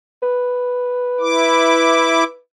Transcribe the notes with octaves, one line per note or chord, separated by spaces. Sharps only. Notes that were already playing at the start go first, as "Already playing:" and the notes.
B4
E4 D6